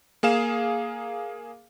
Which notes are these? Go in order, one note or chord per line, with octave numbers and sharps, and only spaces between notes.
A#3 G#4 F5 E7